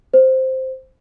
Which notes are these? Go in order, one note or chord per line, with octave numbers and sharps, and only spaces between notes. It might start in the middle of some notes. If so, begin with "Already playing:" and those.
C5